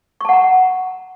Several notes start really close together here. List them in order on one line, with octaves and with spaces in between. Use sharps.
C#6 A5 F#5 A#5